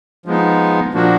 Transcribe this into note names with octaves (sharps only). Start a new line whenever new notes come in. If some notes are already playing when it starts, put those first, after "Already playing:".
F3 G#3 B3 D#4
A#2 F3 A#3 D4 F#4